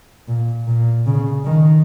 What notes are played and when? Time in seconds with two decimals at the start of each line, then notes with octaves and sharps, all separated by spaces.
0.28 A#2
0.67 A#2
1.06 C#3
1.45 D#3